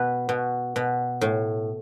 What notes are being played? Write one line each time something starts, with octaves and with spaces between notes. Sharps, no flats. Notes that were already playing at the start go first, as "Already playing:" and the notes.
Already playing: B2 B4
B2
B2
A2